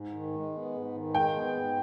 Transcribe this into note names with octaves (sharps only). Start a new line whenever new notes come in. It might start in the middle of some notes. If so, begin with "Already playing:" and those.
Already playing: G#2
D#3
G#3
B3
G#2
D#3
G#3 G5
B3
G#2